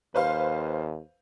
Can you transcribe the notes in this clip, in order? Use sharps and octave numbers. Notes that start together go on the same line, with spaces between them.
D#2 B4 C5 F5